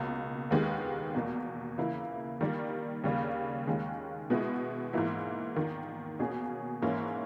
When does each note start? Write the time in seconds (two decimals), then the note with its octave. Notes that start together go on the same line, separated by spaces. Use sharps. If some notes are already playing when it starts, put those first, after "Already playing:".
Already playing: C#2 B2 A#3
0.51 D#2 D#3 G#3 B3 G4
1.15 E2 B2 A#3
1.78 C#3 E3 A#3 E4
2.41 D#3 G3 A#3
3.04 D#2 C#3 G3 A#3
3.67 D#2 D#3 G#3 C#4
4.30 B2 G#3 B3 E4
4.93 G#2 E3 A#3 E4
5.56 E2 D#3 A#3
6.19 B2 A#3 C#4 G#4
6.82 G#2 E3 A#3 C#4 E4